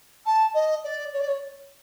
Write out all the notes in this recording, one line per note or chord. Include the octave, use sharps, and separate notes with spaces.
A5
D#5
D5
C#5
D5
C#5